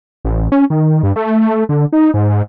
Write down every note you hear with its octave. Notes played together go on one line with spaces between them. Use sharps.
A1
C#4
D#3
G2
A3
A3
D3
D#4
G#2
G#2